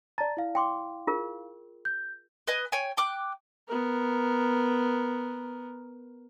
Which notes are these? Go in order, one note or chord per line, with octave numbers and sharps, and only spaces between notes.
D5 A5 A#5 A6
E4 F5
G5 C6 D6
F4 G#4 A#4
G6
B4 D#5 G#5
C#5 G5 G#5
G5 D6 F#6
B3 A#4